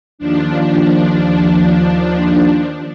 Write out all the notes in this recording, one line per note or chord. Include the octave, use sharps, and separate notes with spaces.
D#2 F3 D4